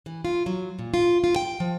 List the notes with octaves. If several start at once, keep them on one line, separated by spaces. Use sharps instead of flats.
E3
F4
F#3
A#2
F4
F4
G5
F3